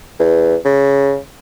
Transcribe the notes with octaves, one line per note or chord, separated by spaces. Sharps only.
E2
C#3